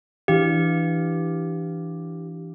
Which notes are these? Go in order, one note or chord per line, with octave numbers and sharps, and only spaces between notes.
E3 D4 G4 F5